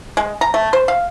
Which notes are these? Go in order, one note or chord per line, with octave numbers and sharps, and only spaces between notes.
G#3
A#5
A3
C5
F5